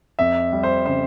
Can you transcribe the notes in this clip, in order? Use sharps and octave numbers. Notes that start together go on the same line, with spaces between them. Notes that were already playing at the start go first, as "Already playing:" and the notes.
F2 E5
G3
C5
C#3 C5